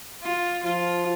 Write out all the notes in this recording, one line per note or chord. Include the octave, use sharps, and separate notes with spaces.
F4
F3 F4